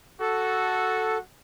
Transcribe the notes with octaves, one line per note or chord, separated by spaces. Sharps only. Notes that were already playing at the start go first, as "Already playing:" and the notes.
F#4 A4